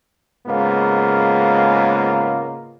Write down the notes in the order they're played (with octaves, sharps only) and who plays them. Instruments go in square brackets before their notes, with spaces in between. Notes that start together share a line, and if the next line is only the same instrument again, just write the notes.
[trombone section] G#2 C#3 G#3 A#3 B3 F4